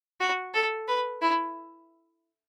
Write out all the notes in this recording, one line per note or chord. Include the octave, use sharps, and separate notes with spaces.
F#4
A4
B4
E4